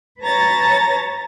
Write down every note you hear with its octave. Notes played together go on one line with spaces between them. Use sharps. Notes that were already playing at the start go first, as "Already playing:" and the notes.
B4 C#5 A5 A#5 A6 A#6